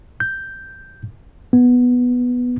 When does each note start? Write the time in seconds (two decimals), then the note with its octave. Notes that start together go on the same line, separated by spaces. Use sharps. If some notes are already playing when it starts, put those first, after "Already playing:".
0.20 G6
1.53 B3